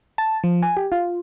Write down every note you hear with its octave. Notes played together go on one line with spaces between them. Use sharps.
A5
F3
G#5
G4
F4